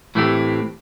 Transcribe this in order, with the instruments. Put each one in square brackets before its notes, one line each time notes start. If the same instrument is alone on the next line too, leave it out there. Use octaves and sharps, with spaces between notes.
[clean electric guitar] A2 E3 A3 C4 G4